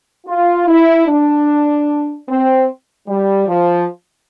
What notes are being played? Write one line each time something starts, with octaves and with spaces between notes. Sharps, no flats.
F4
E4
D4
C4
G3
F3